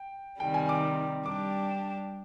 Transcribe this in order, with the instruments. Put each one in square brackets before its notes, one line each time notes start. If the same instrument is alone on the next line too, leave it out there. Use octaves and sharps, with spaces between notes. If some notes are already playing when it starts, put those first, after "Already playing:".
Already playing: [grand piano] G5
[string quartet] C3 D#3 G3 [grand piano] G5
[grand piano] G#5
D6
[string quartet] G3 D4 G4 [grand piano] D6